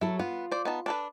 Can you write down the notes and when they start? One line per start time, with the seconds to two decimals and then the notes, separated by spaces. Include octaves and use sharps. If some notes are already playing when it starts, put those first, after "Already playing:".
0.01 F#3 E4 A4
0.19 B3 F4
0.52 C5 D5
0.65 B3 D#4 A5
0.86 D4 A4 B4